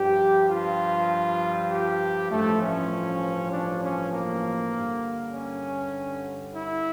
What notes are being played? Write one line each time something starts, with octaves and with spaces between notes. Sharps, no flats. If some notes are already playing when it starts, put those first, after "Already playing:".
Already playing: G2 F3 G4
F4
G4
A1 G2 F3 A3
C#4
D4
C#4
A#3
G2 D3 G3
C#4
E4